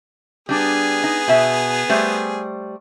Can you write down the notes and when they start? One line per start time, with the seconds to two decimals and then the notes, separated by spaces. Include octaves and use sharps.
0.49 G3 B3 D4 G#4
1.04 D#4
1.28 B2 E5
1.89 G3 A3 C5